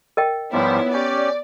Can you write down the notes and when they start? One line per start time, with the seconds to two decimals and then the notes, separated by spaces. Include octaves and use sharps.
0.17 A#4 D#5 G5
0.52 G#2 F3 G3 B3 E4 C#5
0.93 C#4 G4 D5